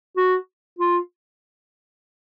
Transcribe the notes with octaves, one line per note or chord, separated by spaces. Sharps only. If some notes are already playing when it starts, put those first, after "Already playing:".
F#4
F4